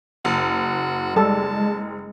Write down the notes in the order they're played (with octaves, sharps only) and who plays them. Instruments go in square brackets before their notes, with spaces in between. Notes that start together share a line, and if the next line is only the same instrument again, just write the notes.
[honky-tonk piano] F#1 [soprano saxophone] F#4
[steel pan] G3 A4 [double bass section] G#3 [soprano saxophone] A5